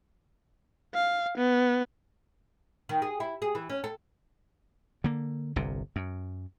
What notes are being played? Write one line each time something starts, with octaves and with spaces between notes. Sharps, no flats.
F5
B3
D#3
G#4
E4
G#4
E3
C#4
A4
D3 A#3
G1 C2 C3
F#2